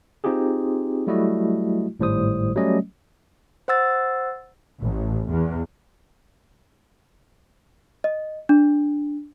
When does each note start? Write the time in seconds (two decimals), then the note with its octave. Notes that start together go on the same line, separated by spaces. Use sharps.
0.24 C4 D#4 F4 G4 G#4
1.07 F#3 G3 A3 E4 F#4 D#5
2.00 G#1 A2 G3 C5 D#6
2.56 F#3 G3 A3 C#4 D#5
3.68 C5 F#5 E6 A6
4.81 A1
5.31 E2
8.04 D#5
8.49 D4